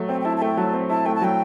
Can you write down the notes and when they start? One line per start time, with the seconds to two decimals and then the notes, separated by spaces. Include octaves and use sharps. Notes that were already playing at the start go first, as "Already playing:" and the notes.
Already playing: F#3 A3
0.09 C4 G5
0.21 G5
0.25 E4 A5
0.37 A5
0.42 A3 G5
0.57 F#3 A5
0.73 C4
0.90 E4 A5
1.05 A3 G5
1.15 A5
1.21 F#3 G5